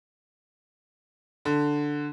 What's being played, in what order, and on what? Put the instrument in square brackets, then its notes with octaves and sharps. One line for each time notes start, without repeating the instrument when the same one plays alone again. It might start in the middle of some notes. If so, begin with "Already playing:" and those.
[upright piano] D3